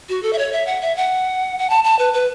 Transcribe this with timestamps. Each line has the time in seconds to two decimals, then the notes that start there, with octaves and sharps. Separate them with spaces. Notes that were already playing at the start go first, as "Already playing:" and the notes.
0.09 F#4
0.23 A4
0.33 E5
0.38 C#5
0.52 E5
0.66 F#5
0.82 E5
0.96 F#5
1.59 F#5
1.70 A5
1.84 A5
1.99 B4
2.13 B4